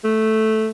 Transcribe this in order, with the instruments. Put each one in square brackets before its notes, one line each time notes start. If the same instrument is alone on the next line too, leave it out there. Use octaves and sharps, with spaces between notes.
[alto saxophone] A3